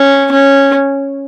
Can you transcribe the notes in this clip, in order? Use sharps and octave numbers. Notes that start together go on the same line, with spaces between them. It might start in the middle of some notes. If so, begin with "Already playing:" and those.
Already playing: C#4
C#4